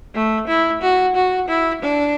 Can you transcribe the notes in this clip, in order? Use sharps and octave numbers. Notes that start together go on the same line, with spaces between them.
A3
E4
F#4
F#4
E4
D4